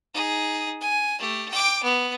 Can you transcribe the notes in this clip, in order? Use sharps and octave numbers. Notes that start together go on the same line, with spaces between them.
D#4 G#4
G#5
A3 G4
G5 D6
B3